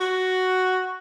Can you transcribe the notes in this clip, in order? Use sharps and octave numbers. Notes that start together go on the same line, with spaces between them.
F#4